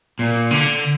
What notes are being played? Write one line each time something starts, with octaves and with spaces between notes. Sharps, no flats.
A#2
D3